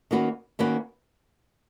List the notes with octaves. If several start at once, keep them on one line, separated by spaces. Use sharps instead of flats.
D#3 A#3 C#4 F#4 B4
D#3 A#3 C#4 F#4 B4